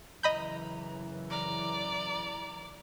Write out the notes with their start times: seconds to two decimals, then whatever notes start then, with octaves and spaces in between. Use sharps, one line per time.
0.23 F#2 C#3 E3 D#5 A#5 B5 G6
1.31 D5 A#5